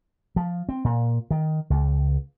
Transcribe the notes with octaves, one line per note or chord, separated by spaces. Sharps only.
F3
C4
A#2
D#3
C#2